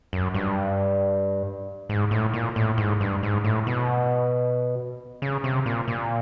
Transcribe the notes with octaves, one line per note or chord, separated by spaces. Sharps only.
F#2
G2
G#2
A2
A#2
A2
G#2
G2
G#2
A2
B2
C#3
C3
A#2
A#2